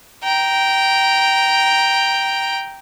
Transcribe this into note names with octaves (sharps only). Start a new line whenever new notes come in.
G5 A#5